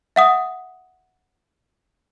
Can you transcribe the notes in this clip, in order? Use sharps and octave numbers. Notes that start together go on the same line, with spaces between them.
E5 F#5 D#6